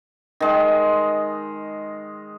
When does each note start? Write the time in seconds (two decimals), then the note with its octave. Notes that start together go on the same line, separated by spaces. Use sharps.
0.40 D#3 G#3 D#4